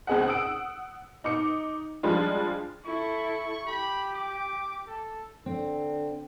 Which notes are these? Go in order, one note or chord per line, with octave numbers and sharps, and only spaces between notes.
C#2 C4 G#4 D#5 F#5
F#5 D#6 E6 D7
D#4 D6 C#7
F3 G3 G#3 D4 F4
E4 A4 C#6
G4 B5
D6
A4
D3 C4